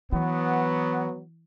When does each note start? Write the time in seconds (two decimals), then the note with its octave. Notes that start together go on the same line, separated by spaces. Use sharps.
0.13 E3 F#3 B3